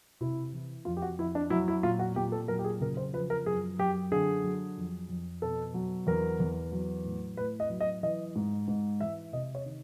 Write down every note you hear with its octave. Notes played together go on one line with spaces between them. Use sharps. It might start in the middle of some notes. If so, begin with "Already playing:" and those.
C3 E4
E3
F2 F4
G4
F#4
F2 E4
D4
F#3 E4
E4
A#2 F4
F#4
A#2 G4
A4
F#3 A#4
G4
G#4
C#3 A#4
C5
F3 B4
A#4
F#2 G#4
F#2 G4
D3 G#4
F#3
F2
F2
B2 A4
F#3
E2 A#4
E2
F#3
A2
A2 B4
D#5
F#3
D#5
E3 D#5
G#2
G#2
E3 E5
C3 D#5
C#5
D#3